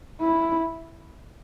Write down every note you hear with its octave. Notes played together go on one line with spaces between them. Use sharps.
E4